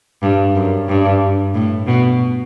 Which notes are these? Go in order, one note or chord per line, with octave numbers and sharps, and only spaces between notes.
G2
F#2
G2
A2
B2